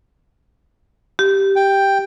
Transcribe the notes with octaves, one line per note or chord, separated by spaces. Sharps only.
G4
G5